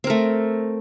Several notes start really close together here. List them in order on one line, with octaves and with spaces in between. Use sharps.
C4 A#4 A3